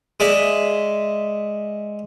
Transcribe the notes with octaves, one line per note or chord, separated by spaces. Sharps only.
G#3 D5 E5